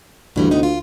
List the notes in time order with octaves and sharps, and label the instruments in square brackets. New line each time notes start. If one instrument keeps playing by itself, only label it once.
[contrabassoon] D2 [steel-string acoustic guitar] G2 E3 G3
[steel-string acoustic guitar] C3 B3 D#4
F4